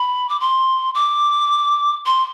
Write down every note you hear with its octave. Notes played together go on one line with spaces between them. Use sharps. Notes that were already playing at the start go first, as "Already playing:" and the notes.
Already playing: B5
D6
C6
D6
C6